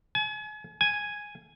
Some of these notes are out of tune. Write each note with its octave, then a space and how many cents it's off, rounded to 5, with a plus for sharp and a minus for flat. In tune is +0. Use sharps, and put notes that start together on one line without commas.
G#5 +40
G#5 +0